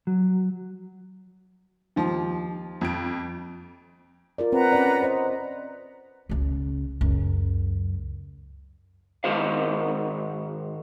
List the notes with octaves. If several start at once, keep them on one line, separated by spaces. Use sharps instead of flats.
F#3
D#2 F3
F2 D7
F4 A#4 D5
C4 B4 F#5 A#5
C#4 D5
C5 D5 D#5
C#2 C#3
C#2 F#2
G#2 D#3 F#4 C5 F5